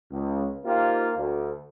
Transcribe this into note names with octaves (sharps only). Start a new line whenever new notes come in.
C#2
A#3 D#4 F4 G4 C5
D2